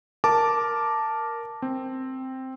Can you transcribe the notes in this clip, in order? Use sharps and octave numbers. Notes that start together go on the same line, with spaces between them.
A#4 A5 D6
C4